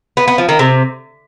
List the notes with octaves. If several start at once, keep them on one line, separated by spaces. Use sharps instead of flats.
B3
B3
F3
D#3
C3